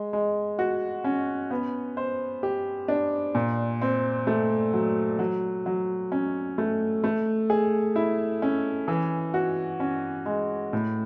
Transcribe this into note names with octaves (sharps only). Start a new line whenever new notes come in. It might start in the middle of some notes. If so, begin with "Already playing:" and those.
Already playing: G#3
G#3
F#4
C#4
B3
C5
G4
D4
A#2
C4
A3
F#3
F#3
F#3
C#4
A3
A3
G#4
E4
C#4
E3
F#4
C#4
G#3
A2